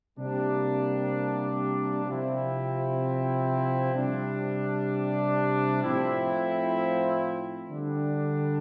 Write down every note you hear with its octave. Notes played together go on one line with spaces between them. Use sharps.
C3 G3 A#3 D4
C3 F3 C4 E4
C3 G3 D4
A2 F3 C4 E4
D3 G3 D4